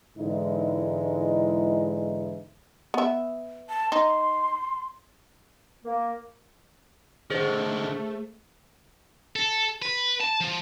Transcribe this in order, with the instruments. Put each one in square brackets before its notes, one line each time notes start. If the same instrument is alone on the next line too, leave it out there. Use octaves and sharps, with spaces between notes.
[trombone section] G#2 D3 E3 G#3 D#4 E4
[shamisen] B3 E5
[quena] A5
[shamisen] D#4 [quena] C6
[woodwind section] A#3
[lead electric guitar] D3 D#3 [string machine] A3 [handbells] G#4 C5 A6
[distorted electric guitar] A4
B4
A5
F3